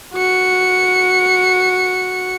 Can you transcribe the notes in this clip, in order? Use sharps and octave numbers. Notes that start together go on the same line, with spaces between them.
F#4 C#7